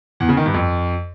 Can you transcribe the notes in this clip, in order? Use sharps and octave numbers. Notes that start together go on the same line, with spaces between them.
E2
C#3
D#3
G2
F2